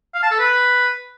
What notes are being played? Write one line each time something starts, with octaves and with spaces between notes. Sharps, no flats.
F5
A5
A4
B4